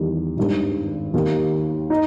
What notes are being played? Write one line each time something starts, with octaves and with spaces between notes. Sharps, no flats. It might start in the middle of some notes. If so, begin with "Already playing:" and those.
Already playing: E2 D#3 G3
G#1 G2 D#3
D#2 D#3 A#3
D#4